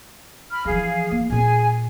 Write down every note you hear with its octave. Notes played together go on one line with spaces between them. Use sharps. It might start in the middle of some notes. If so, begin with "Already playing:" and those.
B5 F6
E3 F3 G#4 F5
A#3
A#2 C4 G#4 G#5